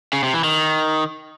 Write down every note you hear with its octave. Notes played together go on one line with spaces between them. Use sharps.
C#3
C3
E3
D#3